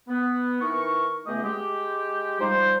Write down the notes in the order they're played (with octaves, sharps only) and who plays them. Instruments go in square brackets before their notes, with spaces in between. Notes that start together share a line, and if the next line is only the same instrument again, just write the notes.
[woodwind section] B3
E3 D#4 A#4 C#6
C#2 A3 B3 G4 G#4 D#5
G#3 G4
F3 G3 D#4 C5